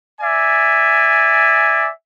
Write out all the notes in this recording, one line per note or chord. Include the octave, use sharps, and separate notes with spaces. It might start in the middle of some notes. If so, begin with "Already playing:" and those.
D5 E5 G#5